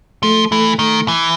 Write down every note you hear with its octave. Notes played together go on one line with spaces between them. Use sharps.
F3 A3
E3 A3
D#3 A3
E3